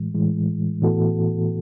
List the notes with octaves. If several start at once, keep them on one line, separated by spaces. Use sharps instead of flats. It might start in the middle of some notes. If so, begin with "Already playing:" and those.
Already playing: A2 E3 G#3
A2 E3 G#3
A2 E3 B3 F#4 A4